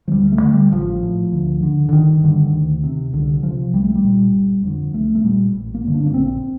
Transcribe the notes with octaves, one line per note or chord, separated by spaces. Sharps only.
F3
D2 G3
A3
D3
G3
A1 F3
A2
D2
D3
D3
G1 D#3
G2 D3
D2
C3
C2 D3
C3 F3
C2 G3
A3
G3
A#2
G1
F2 D3
C2 A3
A3
A#2 G3
A1
A#3
G2 D3
D4
A#3
A#1 C4